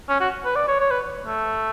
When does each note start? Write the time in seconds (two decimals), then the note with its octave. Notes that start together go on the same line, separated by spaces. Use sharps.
0.09 C#4
0.20 F#4
0.45 B4
0.56 D5
0.68 C#5
0.80 C#5
0.91 B4
1.26 A3